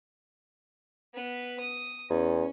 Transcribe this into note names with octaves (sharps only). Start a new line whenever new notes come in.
B3 B4
D#6
E2 C#4